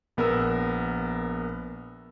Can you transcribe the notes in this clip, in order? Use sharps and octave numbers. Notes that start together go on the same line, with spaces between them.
A#1 B3 A#4 A#5 E6